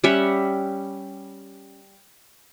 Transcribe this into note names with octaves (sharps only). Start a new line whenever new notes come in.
G3 C#4 E5 F#5